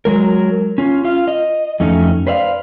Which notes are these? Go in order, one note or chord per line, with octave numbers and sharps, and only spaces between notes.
F#3 G#3 A#4
C#4 F4
F4 F5
D#5
F2 A3 C#4 D#4
B4 C5 D5 E5 F5